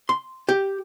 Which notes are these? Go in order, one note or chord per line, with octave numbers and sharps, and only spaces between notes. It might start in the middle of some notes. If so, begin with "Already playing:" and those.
C6
G4